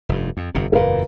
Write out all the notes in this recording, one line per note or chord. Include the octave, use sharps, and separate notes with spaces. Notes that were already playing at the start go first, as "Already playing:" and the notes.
F1 G2
F2
G1 F2 C3
F#1 E2 A#2 A#4 B4 F5